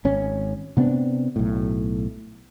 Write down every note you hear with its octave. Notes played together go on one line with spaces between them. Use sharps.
G#1 C#4
C3 B3 C4 D4
B1 A2